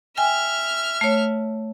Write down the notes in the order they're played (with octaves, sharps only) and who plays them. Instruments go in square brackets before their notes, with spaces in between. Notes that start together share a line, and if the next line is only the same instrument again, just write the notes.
[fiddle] E5 F6 [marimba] G5 G#5
[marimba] A3 C#5